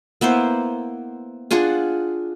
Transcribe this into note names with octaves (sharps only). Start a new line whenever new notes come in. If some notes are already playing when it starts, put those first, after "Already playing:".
A#3 B3 E4 C5
D4 F4 G#4 F#5